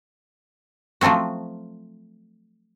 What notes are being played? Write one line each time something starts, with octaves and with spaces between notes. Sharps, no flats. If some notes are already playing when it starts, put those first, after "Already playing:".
F3 F#3 A3 C4 F#4